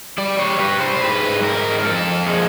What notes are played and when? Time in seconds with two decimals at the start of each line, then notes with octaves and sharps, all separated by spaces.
0.18 G3 D5
0.39 C#5
0.59 G3 B4
0.81 C5
0.95 C5
1.01 G#2 B4
1.43 G#2 A#4
1.79 A#4
1.85 F2 A4
2.26 G#3